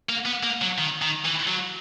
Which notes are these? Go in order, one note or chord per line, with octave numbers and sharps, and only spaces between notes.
A#3
B3
A#3
F#3
D#3
D#3
E3
F#3